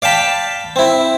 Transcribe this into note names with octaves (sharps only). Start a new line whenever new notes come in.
D5 F5 G5 A5 B5
C4 E4